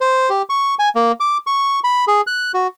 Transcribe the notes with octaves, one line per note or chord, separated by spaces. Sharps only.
C5
G4
C#6
G#5
A#3
D6
C#6
B5
G#4
F#6
F#4